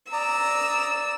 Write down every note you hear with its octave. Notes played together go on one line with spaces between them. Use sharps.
D5 A#5 D#6 E6